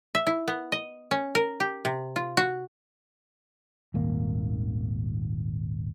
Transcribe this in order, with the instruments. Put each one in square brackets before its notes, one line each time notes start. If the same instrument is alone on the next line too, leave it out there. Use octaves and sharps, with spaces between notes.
[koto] E5
E4
B3
D#5
C#4
A#4
G4
C3
F4
F#4
[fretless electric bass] D#1 G#1 A#3